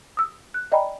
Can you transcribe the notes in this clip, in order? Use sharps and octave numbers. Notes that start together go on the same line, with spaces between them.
D#6 E6
F#6
D5 D#5 G5 G#5 A#5 B5